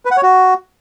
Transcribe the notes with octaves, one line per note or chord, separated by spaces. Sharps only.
B4
F#5
C#5
F#4